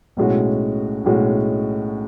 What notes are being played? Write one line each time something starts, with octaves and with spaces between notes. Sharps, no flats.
B1 A2 G#3 C#4 F#4
B1 A2 G#3 C#4 F#4